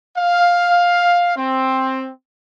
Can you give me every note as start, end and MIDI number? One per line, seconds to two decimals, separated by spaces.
0.17 1.33 77
1.36 2.08 60